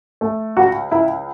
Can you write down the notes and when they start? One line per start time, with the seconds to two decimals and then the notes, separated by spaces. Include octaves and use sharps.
0.21 A3
0.57 C#2 F#4
0.92 C#2 E4